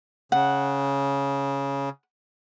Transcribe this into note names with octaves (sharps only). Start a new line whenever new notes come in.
C#3 F#5